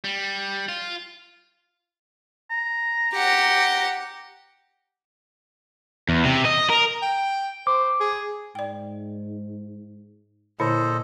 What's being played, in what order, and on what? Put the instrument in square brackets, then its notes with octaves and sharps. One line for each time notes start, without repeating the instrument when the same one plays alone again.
[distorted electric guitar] G3
F4
[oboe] A#5
[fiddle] G4 F#5
[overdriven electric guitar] E2
C3
D#5
A#4
[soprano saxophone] G5
[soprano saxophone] C5 [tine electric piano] D6
[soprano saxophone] G#4
[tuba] G#2 [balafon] D5 G5
[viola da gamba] A#2 [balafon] D3 E4 C#5 [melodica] A4 C5 D#5